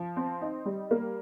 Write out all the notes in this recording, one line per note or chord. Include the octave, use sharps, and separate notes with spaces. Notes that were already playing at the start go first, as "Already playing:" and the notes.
Already playing: F3
C4
D#4
G3
A#3